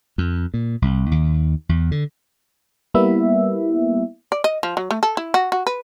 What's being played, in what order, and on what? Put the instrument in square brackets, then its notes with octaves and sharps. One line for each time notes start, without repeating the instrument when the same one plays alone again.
[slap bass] F2
A#2
C2
D#2
E2
D3
[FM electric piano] G3 A#3 B3 E4 E5
[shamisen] D5
D#5
F3
F#3
A3
A4
E4
F#4
F#4
B4